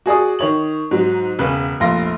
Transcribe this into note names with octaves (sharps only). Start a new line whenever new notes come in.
F#4 G#4 D5 D#6
D#3 C#5 F#7
G#2 F#3
E1 C#3 B4 F#6
F1 A#1 F4 C6 A#6